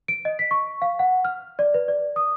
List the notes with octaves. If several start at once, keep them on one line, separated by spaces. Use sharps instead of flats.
D7
D#5
B6
C#6
F5
F#5
F6
D5
B4
D5
D#6